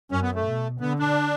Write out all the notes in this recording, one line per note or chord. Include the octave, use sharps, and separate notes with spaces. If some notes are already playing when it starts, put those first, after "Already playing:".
F#2 C#4
B3
A3
B2
D3 B3
D4